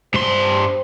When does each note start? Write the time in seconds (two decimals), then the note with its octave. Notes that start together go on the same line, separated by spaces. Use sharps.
0.14 G2 C5 C6